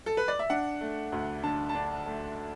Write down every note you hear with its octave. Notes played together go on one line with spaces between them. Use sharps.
A4
B4
D5
E5
D4 F#5
A3
D2
D3 A5
A5
D4
A3